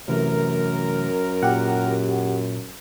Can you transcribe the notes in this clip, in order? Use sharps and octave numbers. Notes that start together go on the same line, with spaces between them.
F#2 C3 E3 A3 A#4
A#2 G4 F#5